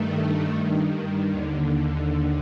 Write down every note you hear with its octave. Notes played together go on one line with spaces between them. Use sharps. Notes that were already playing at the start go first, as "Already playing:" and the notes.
Already playing: G2 D#3 A3
A3
G2 D#3
D#2 D3
D#2 D3